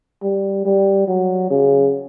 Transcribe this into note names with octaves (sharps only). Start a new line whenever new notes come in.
G3
G3
F#3
C#3